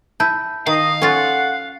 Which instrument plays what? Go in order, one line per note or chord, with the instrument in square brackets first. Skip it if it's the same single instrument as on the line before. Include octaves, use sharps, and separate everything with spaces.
[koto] E4 [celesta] A5 G6
[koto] D#3 [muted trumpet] D#5 [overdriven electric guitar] F5
[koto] C#4 F4 [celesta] A4 A6 [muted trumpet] F#5